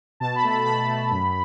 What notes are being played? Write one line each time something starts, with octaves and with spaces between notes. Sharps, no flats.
B2 A5
B5
A3
B5
B2 B5
A3
F#2